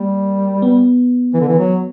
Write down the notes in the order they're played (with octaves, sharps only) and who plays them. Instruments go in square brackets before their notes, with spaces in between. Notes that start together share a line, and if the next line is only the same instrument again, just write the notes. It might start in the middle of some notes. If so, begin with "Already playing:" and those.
Already playing: [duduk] G3 [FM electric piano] A#3
[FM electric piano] B3
[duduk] E3
D3
E3
F#3